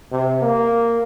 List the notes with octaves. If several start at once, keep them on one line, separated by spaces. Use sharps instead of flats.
C3
A#3